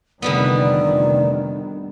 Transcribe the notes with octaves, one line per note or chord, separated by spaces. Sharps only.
F1 D3 D#3 G3 B3 D5